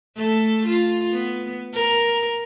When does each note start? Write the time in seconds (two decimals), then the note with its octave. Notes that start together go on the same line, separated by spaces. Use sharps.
0.16 A3 A4
0.66 F4
1.11 B3
1.74 A#4